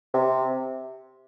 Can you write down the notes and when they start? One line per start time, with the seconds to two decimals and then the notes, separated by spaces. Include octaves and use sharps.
0.14 C3